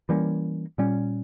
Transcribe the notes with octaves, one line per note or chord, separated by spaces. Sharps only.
E3 G3 A#3 C#4
A#2 G3 C#4